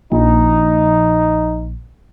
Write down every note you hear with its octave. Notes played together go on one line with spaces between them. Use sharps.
A#1 D#4